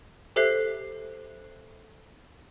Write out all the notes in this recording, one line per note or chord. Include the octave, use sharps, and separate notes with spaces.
G4 A4 C5 E5 F#6 C7